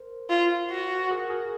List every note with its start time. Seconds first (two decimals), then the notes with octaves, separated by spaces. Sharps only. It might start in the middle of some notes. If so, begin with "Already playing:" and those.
Already playing: A#4 C5
0.30 F4
0.70 F#4
1.11 G#4 A#4
1.30 G#4 A#4